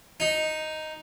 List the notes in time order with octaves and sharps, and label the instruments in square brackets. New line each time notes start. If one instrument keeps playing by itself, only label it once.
[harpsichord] D#4